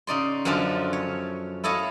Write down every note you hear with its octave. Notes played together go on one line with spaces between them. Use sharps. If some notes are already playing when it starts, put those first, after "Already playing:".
C#3 D#4 D5 C6
F#2 D3 F3 C#4 F4 A4
C#5
E4 A4 C#5 D#5 F5